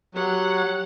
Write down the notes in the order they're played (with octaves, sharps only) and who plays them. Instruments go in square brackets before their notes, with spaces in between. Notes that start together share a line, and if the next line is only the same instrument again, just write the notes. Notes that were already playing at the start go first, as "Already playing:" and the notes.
[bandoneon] F#3 [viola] G4 F#5